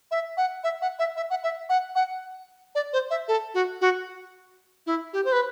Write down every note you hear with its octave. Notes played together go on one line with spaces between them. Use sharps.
E5
F#5
E5
F#5
E5
E5
F#5
E5
F#5
F#5
D5
C5
E5
A4
F#4
F#4
E4
G4
C5
B4